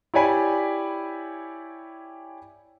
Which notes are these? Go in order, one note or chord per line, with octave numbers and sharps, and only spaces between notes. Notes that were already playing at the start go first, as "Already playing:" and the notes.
E4 G4 C#5 D5 G#5 B5